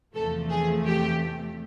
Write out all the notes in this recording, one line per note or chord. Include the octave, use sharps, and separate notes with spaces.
E2 C3 F3 A3 A4
G#4
G4